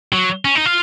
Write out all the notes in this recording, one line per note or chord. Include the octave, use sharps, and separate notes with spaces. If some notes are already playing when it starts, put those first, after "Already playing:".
F#3
C#4
D#4
F4